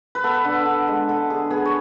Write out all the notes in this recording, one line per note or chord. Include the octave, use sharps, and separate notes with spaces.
B4
B3 A4
D3
D3
G#3
D3 A4
D3 G#4
B3 G#4
C#5